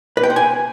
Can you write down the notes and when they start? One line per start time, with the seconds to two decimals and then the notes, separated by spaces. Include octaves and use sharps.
0.17 B4
0.23 G5
0.30 C5
0.36 G#5